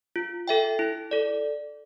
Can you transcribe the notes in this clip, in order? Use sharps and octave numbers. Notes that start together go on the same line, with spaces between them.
F4
A4 E5 G5
E4
A4 D5